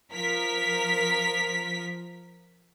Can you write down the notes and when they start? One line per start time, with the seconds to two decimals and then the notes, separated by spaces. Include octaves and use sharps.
0.12 F3 A#4 B6